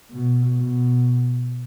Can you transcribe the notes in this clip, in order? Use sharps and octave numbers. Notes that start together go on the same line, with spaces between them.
B2
B2